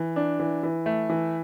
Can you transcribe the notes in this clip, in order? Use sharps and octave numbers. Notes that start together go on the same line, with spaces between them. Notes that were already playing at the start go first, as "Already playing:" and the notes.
Already playing: E3
D4
E3
E3
A3
E3